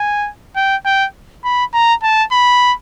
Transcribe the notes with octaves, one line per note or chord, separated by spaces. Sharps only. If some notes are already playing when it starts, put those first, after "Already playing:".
Already playing: G#5
G5
G5
B5
A#5
A5
B5